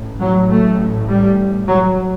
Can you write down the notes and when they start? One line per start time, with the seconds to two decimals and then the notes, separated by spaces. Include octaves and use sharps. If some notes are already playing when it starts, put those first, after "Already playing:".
Already playing: A1 A2
0.20 F#3
0.49 A3
1.07 G3
1.67 F#3